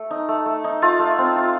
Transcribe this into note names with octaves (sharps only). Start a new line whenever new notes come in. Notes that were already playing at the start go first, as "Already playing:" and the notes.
Already playing: A3
D#4
A3
A3
D#4
A3 F4
A3
C4
F4